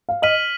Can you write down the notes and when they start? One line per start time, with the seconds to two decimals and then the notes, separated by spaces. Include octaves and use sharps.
0.09 F5
0.22 D#5 F6 B6 D#7 F#7